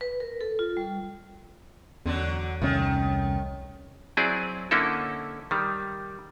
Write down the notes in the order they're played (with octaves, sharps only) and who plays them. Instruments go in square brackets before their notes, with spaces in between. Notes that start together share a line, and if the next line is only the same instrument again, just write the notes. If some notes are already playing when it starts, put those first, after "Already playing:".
[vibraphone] B4
A#4
A4
F4
G3
[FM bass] E2 [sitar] D3 F#3 D4
[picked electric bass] C2 C#4 [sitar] D#3 A3
[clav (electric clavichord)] F#3 C4 E4 G#4 D5
D3 A#3 C#4 D#4 E4 A4
D#3 G3